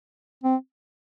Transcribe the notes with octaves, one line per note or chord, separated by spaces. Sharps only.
C4